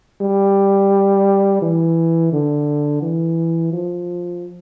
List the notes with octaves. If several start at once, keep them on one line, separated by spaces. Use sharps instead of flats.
G3
E3
D3
E3
F3